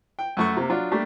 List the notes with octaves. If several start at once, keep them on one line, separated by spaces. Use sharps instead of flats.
G5
F#2 A3 C#6
C3 A#3
F#3 D4 F4
G3 A3 A#3 D4 G4